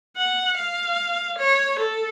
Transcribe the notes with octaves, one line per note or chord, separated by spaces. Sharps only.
F#5
F5
C#5
A4